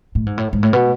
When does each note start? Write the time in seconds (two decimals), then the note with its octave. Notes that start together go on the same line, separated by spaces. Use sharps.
0.15 A2
0.26 G#2
0.38 A2
0.53 G#2
0.63 A2
0.73 B2